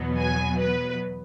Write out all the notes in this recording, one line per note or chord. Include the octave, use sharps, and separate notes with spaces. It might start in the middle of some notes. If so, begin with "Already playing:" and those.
Already playing: E2 B2 F#3 B3
G#5
B4